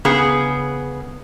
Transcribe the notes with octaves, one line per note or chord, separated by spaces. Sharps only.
C#3 B3 G#4